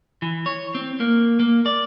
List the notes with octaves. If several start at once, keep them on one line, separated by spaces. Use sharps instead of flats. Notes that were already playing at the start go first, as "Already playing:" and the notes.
E3
C#5
C4
A#3
A#3
D5